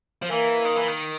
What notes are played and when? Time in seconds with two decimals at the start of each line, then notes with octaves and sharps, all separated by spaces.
0.22 F3
0.31 E3 A#3
0.65 D#3
0.76 E3
0.88 D#3